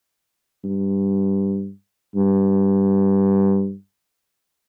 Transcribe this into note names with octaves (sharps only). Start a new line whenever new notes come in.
G2
G2